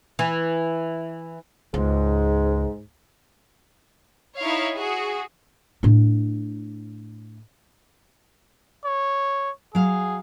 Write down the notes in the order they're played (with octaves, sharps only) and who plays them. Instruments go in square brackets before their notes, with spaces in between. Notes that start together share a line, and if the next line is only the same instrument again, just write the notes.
[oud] E3
[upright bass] C#2 [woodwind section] G#2 G#3
[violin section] D#4 E4 C#5 F5
F#4 G#4
[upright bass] A2 D4
[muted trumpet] C#5
[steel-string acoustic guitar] F#3 F5 [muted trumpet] G#4